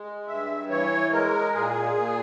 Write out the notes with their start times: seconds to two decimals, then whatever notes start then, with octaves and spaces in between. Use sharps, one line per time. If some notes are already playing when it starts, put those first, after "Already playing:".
Already playing: G#3
0.28 G2 E5
0.69 E3 C#5
1.11 G#3 A#4
1.53 A#2 G#4
1.95 A#2